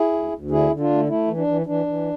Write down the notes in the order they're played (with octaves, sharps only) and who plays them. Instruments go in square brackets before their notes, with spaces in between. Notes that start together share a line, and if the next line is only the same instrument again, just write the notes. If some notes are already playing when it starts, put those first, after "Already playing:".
Already playing: [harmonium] E4 G#4
D2
D2
D3 E4 G#4
D3
D4 F4
A3
A3 E4
E3
D4
E3
E3 D4
E3